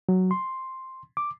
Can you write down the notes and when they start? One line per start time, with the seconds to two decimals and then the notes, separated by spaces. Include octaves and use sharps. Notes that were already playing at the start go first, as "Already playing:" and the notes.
0.09 F#3
0.31 C6
1.17 D6